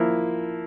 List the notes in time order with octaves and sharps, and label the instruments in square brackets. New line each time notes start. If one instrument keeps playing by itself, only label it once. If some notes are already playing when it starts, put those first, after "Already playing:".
Already playing: [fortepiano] F3 A#3 E4